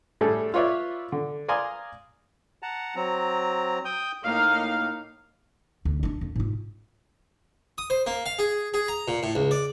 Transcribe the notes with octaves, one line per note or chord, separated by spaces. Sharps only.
A2 G3 A3 D4 G#4 A4
F4 B4 C#5 D5 E5
D3
D5 F5 G#5 A#5 C6 D#6
F#5 A5 A#5
F#3 C4 A#5
G5 D#6 G6
A2 A#3 D#4 F5
D2
D4 E4
F2
G#2 F4
D#6
C5
A#3
F5
G#4
G#4
A#5
A#2
A2
C#2
D5